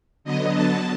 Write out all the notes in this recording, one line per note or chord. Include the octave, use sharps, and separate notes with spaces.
D3 F#3 B3 D#5
A5